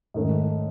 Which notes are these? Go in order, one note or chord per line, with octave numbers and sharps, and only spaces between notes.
G#2 D#3 A3 C#4